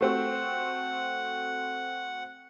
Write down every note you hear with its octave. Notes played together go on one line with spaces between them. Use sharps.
A3 C4 F#4 F#5